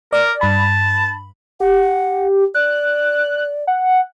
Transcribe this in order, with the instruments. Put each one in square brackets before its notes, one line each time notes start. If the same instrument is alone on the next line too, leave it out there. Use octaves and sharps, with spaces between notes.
[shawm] A#4 [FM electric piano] D5
[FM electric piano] G2 B5 [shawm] A5
[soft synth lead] G4 [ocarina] F#5
[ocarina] D5 [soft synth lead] F#6
[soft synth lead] F#5